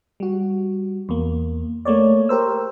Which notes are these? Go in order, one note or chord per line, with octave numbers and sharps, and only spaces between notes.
G3 F#4
E2 A#3
A3 A#3 C#5 D5
G4 A#4 C5 E6